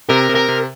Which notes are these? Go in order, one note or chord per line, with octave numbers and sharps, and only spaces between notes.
C3 A#4
C3
A#4
C3